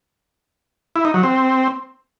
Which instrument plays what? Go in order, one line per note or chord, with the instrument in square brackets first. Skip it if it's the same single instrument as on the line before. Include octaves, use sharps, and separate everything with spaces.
[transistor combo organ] E4
D#4
F#3
C4